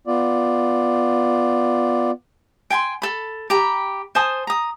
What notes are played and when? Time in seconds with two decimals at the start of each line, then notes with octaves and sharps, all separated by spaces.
0.07 B3 F4 D5
2.70 G5 G#5 B5 C6
3.02 A4 B5
3.50 G4 A#5 B5
4.15 C5 G#5 A5 D#6
4.47 A#5 D#6